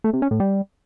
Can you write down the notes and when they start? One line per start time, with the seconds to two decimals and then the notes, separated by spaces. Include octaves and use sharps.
0.04 A3
0.13 C3
0.22 C#4
0.31 A2
0.40 G3